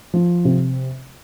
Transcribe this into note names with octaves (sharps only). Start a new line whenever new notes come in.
F3
C3